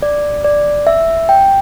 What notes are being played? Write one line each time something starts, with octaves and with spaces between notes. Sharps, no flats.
D5
D5
E5
G5